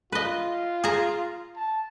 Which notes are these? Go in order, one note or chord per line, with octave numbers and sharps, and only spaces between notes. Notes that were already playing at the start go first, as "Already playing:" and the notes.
F4 B4 D#5
G#4 A#5
A5